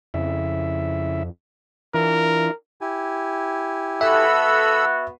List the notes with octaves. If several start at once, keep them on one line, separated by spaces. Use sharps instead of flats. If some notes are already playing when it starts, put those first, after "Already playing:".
F2 C#3 E4 E5
E3 D4 E4 F4 A#4
E4 G4 G#5
B3 F#4 A4 E5 B5 E6